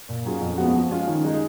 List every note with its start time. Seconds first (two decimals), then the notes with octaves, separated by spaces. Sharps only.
0.09 A#2
0.25 F#3 C#4 F4 G#4
0.41 F2
0.58 F3 G#3 B3 F#4
0.75 F3
0.91 G#3 C#4 F4 G#4
1.07 D#3
1.24 G#3 D#4 G#4